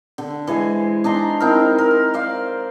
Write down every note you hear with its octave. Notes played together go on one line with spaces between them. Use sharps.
D3
E3 G#3 C5 G#5
D4 D#4 A#5 C6
C4 D#4 E4 A#4
A#4
C5 D5 F5